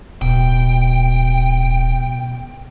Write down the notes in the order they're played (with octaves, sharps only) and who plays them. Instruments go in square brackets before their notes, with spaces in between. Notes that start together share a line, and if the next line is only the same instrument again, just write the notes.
[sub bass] D1 [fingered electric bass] B2 [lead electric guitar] G5